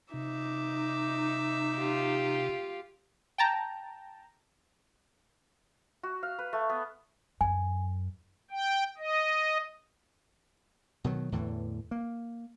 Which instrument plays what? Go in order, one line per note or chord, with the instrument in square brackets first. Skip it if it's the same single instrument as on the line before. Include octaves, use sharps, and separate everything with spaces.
[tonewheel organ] C3 [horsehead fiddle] D#4 [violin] E5 D6
[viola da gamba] F4 G4
[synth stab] G5 A5 A#5
[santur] F#4
F5
B4
A3
B3
[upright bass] F#2 [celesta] G#5
[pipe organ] G5
D#5
[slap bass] B2 D#3 F#3
E2 A2 D3 E3
A#3